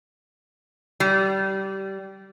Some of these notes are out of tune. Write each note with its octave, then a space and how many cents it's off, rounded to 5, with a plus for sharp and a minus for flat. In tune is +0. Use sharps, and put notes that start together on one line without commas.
G3 -20